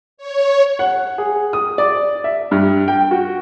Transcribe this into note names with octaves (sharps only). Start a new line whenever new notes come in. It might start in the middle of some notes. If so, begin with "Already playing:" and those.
C#5
F#5
G#4
D#6
D5
E5
G2
G5
F#4